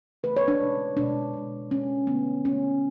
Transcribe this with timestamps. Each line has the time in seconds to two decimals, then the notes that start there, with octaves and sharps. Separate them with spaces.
0.23 C#3 E3 A3 B4
0.37 C#5
0.48 D4
0.60 B2 G#3
0.97 B2 G#3 D4
1.34 B2 G#3
1.70 B2 G#3 C#4
2.07 D3 A3 B3
2.45 D3 A3 C#4